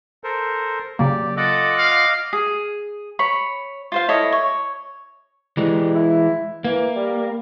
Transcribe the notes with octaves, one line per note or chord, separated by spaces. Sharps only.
A4 A#4 C5
C#3 F#3 A#3 G4 D5
F4 A4 D#5 F#5 D6 F#6
F5
G#4
C#5 B5
F4 C5 F5
E4 A4 C#5 D#5
C#5
E3 G3 G#3
E4
E3 A#3
G3